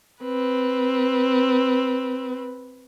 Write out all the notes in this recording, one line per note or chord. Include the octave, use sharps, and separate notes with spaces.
C4 B4